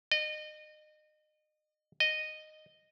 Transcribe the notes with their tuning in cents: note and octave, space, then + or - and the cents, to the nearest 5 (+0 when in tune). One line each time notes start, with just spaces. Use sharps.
D#5 -30
D#5 -10